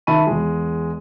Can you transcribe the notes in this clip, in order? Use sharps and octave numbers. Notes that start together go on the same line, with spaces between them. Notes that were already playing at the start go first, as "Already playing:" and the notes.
D#3 E5 A5 B5 C#6 D#7
E2 G#3